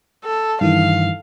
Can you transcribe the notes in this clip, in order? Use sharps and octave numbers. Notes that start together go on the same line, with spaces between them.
A4
G2 D#3 E3 F5